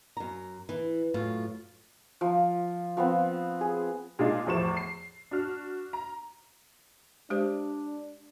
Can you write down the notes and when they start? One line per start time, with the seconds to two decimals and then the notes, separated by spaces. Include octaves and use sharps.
0.17 F#2 A#5
0.69 E3
1.14 F#2 A2 F4
2.21 F3
2.97 F3 B3 C4
3.61 G#4
4.19 A#2 G#3 D4 D#4 F4
4.46 E2 A2 F3 C#6 E7
4.77 C7
5.31 D4 F#4 F6
5.93 A#5
7.30 G#3 D4 G4 C5